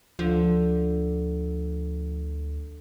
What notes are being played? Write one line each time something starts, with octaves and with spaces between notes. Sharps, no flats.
D2 D3 F3